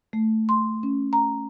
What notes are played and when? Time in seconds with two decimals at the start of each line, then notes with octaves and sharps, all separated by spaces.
0.13 A3
0.49 C6
0.83 C#4
1.13 A#5